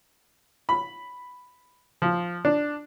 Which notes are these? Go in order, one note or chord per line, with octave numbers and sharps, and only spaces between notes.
B5
F3
D4